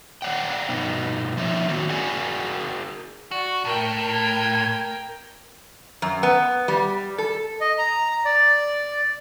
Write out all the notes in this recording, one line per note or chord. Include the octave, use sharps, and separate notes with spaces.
C#5 D5 F#5 G5
G2 B2 B3 D#4
F3 A#3 D#4 C#5 E5
D#3 F#3 A#3 B3 F#4
F#4 G#4 A#4 D5 F#5 G#5
F#4 D5 C#6
A2 A#4 G5
G#6
F#2
B3
G3
A4
D#5
A#5
D5